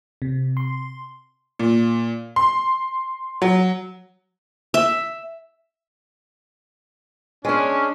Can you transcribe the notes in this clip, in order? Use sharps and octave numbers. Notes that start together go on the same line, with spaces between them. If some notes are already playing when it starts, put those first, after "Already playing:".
C3
C6
A#2
C6
F#3
E5
G#3 C#4 D4